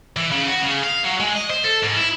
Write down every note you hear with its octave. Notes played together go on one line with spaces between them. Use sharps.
E3
C#3
F#4
C#3
F5
F#3
G#3
D#5
C5
A4
G#2
E4